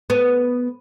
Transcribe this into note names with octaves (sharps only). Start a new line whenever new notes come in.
B3